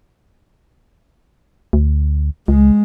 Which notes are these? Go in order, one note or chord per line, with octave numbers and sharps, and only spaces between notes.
D2
C#2 G#3